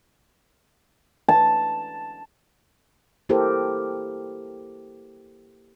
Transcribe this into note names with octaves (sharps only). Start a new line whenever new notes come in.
A5
A#3 E4 G4 A4 A#4 C5